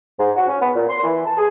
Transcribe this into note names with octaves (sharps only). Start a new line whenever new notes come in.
G#2
F#4
C#4
B3
A#2
C6
E3
A5
G#4